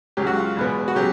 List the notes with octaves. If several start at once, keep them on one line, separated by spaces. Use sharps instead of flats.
C#2 C#3 F#3 G4
F#4
F4
E2 B2 G#3 B3
F#4
C#3 F#3 G4